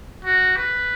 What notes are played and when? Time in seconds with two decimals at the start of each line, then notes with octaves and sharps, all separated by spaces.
0.24 F#4
0.56 B4